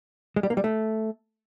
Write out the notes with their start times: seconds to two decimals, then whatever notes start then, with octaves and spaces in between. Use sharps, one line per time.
0.36 G#3
0.43 G3
0.50 A#3
0.57 G3
0.64 A3